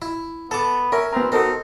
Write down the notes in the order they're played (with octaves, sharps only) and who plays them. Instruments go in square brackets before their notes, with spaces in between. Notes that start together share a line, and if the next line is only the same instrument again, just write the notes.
[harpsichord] E4
[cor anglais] B3 [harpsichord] A4 D6 [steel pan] A5
[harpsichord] C#4 [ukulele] A#4 [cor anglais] E5
[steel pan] B3 A#5 [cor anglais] C4
[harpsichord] C4 [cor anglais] D#4 [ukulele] F#4 A4 A#4